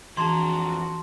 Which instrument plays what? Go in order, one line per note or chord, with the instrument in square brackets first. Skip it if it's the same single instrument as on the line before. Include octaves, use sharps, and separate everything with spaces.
[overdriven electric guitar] F2 A#5 [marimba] E3 D4 G#4 [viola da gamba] F#4 [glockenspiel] A5 C6